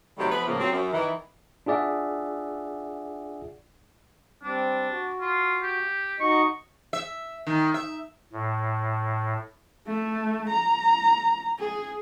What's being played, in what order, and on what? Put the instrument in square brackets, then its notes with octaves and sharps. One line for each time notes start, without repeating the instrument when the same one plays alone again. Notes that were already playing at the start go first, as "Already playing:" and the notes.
[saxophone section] C3 D#3 F#3 G3 A3
F3 B3 E4 B4
A2 C#3 F3 A#3
F#3 C4
F#2
D#3 E3
[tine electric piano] D4 F4 G#4 D5 E5 F#5
[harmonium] G3 C4 [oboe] D4
[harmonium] F#4
[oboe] F4
G4
[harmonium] D#4 F#4 D#5 [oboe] C#6
[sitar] E5
D#3
E5
[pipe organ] A2
[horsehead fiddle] A3
A#5
G#4